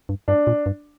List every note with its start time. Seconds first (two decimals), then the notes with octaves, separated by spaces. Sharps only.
0.09 G2
0.28 G2 D4
0.47 A#2
0.66 G2